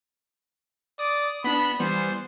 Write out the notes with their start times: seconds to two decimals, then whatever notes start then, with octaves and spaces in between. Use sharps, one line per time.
0.99 D5 D#6
1.44 B3 D4 B5
1.80 E3 G3 B3 C5